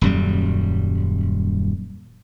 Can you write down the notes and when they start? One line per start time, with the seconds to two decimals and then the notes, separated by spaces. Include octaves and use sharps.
0.01 D#1 F#2 G3